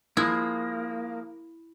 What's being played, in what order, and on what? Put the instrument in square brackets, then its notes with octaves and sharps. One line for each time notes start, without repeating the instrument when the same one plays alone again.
[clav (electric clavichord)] F3 G#3 [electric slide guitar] A#3 [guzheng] E4